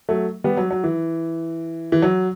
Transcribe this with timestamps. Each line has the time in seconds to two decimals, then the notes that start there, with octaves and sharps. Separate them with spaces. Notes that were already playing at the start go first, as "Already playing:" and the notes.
0.09 F#3 A3
0.44 G3 B3
0.57 F#3
0.71 F#3
0.84 E3
1.92 E3
2.02 F#3